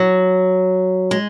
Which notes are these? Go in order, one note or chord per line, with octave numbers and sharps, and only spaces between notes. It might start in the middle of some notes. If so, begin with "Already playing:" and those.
Already playing: F#3
G#3